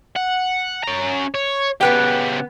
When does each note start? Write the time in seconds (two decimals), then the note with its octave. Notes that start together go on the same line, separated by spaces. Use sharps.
0.16 F#5
0.84 C#4 A#5
1.34 C#5
1.81 C#3 B3 G4 B4 G5